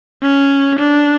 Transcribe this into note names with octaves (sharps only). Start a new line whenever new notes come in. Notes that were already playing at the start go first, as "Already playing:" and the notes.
C#4
D4